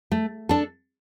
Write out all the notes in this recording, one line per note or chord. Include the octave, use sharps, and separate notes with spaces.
A3
D4 A4